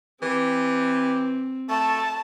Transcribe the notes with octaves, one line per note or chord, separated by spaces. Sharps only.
E3 C4 G4
A3 A5